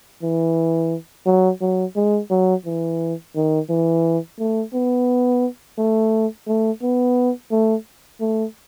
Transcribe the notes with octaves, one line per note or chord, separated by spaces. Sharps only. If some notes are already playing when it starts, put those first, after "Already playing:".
E3
F#3
F#3
G#3
F#3
E3
D#3
E3
A3
B3
A3
A3
B3
A3
A3